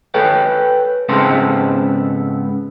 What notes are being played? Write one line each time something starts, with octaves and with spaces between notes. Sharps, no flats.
A4 B4 C#5 G5
G#2 C#3 B3 C4 A4 C6